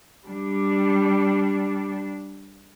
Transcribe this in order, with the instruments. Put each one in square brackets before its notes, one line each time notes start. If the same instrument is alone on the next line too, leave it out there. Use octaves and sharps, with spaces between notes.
[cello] G3 D4